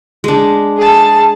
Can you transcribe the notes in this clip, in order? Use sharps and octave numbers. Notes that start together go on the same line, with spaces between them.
G#3 D4
G#4 A5